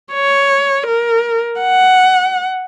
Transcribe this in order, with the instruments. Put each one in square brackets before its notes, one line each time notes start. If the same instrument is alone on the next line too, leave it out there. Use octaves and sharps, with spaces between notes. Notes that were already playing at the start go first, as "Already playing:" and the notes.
[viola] C#5
A#4
F#5